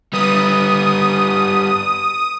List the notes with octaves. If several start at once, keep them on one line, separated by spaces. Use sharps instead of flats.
G3 B3 D#6